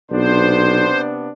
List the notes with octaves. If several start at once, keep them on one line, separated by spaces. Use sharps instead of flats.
B1 C3 B3 D4 C5